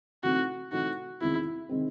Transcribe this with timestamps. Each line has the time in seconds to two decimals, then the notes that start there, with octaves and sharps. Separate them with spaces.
0.23 C3 E3 A3 C4 D#4 F#4
0.72 C3 E3 A3 C4 D#4 F#4
1.21 E2 C3 D#3 G#3 C4 E4
1.69 C3 D#3 G#3 C4